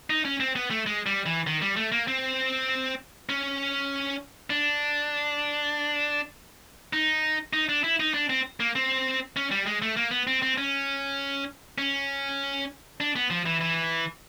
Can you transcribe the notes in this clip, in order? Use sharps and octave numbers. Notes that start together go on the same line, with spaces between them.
D#4
C#4
C4
B3
A3
G#3
G3
E3
D#3
G3
A3
A#3
C4
C#4
D4
D#4
D#4
D4
E4
D#4
D4
C4
A#3
C4
C#4
G3
G#3
A3
A#3
B3
C4
C4
C#4
C#4
D4
B3
F3
E3
E3